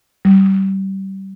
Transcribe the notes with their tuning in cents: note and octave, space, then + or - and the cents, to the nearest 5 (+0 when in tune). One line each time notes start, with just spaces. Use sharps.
G3 -25